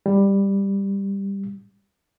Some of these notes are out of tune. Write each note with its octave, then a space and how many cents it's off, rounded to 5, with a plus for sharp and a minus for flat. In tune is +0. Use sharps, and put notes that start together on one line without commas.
G3 +10